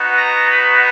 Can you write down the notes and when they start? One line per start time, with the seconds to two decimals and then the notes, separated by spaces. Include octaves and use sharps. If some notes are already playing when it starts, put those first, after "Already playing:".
Already playing: B3 D#4 F#4
0.17 A#5
0.50 B5